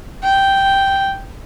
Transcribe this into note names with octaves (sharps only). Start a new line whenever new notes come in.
G5